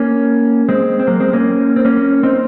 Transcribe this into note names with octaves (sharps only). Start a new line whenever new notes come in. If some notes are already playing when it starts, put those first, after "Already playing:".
Already playing: A#3 C#4
G#3 C4
C4
F#3 A#3
G#3 C4
A#3 C#4
C4
A#3 C#4
C4 D#4